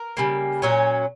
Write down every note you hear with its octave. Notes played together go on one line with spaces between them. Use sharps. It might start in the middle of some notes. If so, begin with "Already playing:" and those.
Already playing: A#4
C#3 G3 A#3
A#2 F#3 C#4